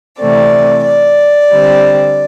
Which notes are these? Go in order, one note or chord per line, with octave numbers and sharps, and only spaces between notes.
C3 E3 A3 C4 D5
D5
D3 G3 C4